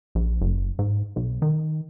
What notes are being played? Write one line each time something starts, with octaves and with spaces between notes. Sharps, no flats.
A#1
F#1
G#2
B1
D#3